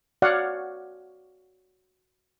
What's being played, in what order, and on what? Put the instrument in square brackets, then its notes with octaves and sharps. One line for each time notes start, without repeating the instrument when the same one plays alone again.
[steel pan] F#4 C#5 D5 F5 F#5